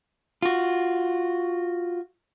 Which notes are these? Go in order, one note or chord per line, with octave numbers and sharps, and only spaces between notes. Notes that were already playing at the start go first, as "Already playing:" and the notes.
F4 F#4